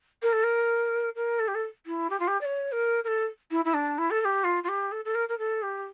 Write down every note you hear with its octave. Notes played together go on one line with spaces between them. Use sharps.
A#4
A4
A#4
A#4
A4
G4
A4
E4
G4
F4
G4
D5
C#5
A#4
A#4
A4
E4
E4
D4
E4
A4
A4
G4
F4
F4
G4
A4
A4
A#4
A#4
A4
G4